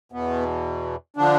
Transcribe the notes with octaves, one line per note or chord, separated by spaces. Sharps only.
E2 B2 B3
D3 F3 D4